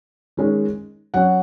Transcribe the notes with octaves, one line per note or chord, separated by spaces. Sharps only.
D#3 G#3 C#4
F#3 C#4 F#5